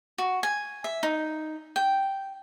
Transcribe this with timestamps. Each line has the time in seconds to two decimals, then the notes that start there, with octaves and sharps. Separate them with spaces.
0.18 F#4
0.43 G#5
0.84 E5
1.03 D#4
1.76 G5